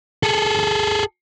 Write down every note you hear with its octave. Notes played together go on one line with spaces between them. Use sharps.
G#4 A4